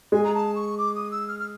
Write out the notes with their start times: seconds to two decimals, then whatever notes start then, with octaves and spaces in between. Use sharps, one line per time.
0.12 G#3 G#5
0.24 A#5
0.34 A5
0.55 C#6
0.78 D6
0.95 D#6
1.11 E6
1.28 F6
1.39 F6